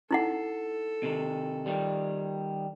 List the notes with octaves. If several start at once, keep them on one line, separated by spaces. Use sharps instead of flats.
D#4 E4 A4 F#5
C3 D#3
D#3 G3